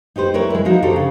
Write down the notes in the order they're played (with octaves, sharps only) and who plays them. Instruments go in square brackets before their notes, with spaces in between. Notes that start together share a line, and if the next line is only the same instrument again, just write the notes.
[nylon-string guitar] D#4 G4 B4 C5
E4 A#4 B4 C#5
G#3 E4
F3 D#4 F#4
D#4 F#4 G4 A4 C5
C#3